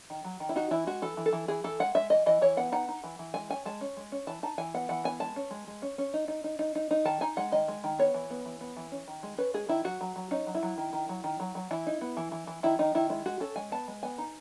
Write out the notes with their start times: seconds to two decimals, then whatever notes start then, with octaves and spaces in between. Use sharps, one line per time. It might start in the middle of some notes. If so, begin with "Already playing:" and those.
0.10 D#3
0.24 F#3
0.40 D#3
0.49 E4
0.56 D#4 F#4
0.71 E3 E4
0.87 G#3 F#4
1.02 E3 A4
1.17 E3
1.26 A4
1.33 E3
1.48 E3 G#4
1.64 E3 A4
1.79 G#3 F#5
1.95 G#3 E5
2.10 E3 D#5
2.26 E3 D#5
2.42 E3 C#5
2.57 B3 F#5
2.72 D#4 F#5
2.88 D#4
3.04 E3
3.19 E3
3.34 G#3 G#5
3.50 C#4 G#5
3.66 G#3 A5
3.81 C#4
3.97 G#3
4.12 C#4
4.27 E3 A5
4.43 D#4 A5
4.58 E3 G#5
4.74 B3 F#5
4.89 E3 F#5
5.04 B3 G#5
5.20 G#3 A5
5.36 C#4
5.51 G#3
5.67 G#3
5.82 C#4
5.98 C#4
6.14 D#4
6.28 D#4
6.44 D#4
6.59 D#4
6.75 D#4
6.91 D#4
7.05 D#3 A5
7.21 D#4 G#5
7.37 G#3 F#5
7.52 D#3 D#5
7.68 G#3
7.84 D#3
7.99 B3 C#5
8.14 E3
8.30 B3
8.45 E3
8.61 B3
8.77 E3
8.92 C#4
9.08 D#3
9.23 G#3
9.38 C#4 B4
9.54 G#3 G#4
9.69 D#3 E4
9.84 F#3 F#4
10.01 F#3
10.16 F#3
10.31 C#4 D#4
10.47 F#3
10.55 E4
10.63 F#3
10.78 D#3
10.93 D#3
11.09 F#3
11.24 D#3
11.40 F#3
11.55 F#3
11.71 E3 E4
11.87 D#4
12.01 B3
12.17 E3
12.32 E3
12.47 E3
12.63 D#3 E4
12.79 D#3 D#4
12.95 D#3 E4
13.10 G#3 E4
13.25 G#3 F#4
13.40 C#4 A4
13.56 G#3 G#5
13.71 B3 A5
13.88 G#3
14.03 B3 G#5
14.18 D#4